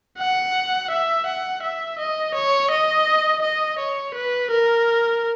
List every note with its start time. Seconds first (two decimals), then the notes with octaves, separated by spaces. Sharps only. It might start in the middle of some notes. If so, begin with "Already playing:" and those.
0.18 F#5
0.91 E5
1.26 F#5
1.63 E5
1.99 D#5
2.35 C#5
2.71 D#5
3.42 D#5
3.79 C#5
4.15 B4
4.51 A#4